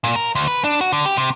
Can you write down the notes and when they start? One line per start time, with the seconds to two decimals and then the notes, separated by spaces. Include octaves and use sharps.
0.04 A#2
0.16 A#4
0.35 D2
0.48 B4
0.64 D4
0.81 F#4
0.93 D3
1.05 G4
1.18 C3